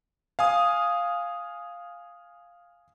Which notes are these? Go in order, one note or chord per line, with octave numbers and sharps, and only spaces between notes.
F5 G#5 D#6